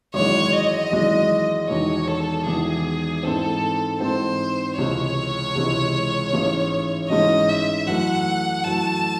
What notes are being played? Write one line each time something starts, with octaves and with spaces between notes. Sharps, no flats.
G#1 F#2 E3 G#3 C#5
D#5
G#1 F#2 E3 G#3
E1 E2 D#3 C#5
A4
E1 E2 D#3 G#4
G#2 E3 C4 A4
G#2 E3 C4 C5
C#2 C3 E3 G#3 C#5
C#2 C3 E3 G#3
A1 G#2 E3 G#3 C#4
A1 G#2 E3 G#3 C#4 D#5
E5
F#2 E3 A3 F#5
F#2 E3 A3 A5